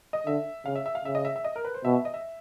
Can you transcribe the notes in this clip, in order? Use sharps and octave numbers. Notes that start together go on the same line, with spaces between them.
D#5
D3 E5
C#3 F5
E5
E5
F5
C#3 E5
D#5
E5
E5
D#5
A#4
B4
C5
B2 E5
E5
D#5
E5